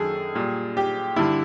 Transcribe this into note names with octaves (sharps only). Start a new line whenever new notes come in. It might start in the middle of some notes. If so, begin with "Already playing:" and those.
Already playing: F#2 D#3 F#3 G#4 A4
A#2 G3
G4
G2 D3 G3 E4